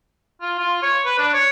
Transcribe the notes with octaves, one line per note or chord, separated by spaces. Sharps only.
F4
F4
C#5
B4
D4
C#5